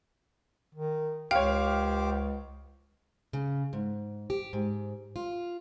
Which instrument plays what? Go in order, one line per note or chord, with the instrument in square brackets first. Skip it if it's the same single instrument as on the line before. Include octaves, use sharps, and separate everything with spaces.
[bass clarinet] D#3
[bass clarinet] C#2 [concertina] G4 C5 D6 [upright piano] C#5 F5 [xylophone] G5
[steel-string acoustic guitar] C#3
G#2
G4
G#2
F4